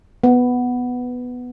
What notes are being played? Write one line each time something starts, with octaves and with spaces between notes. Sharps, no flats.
B3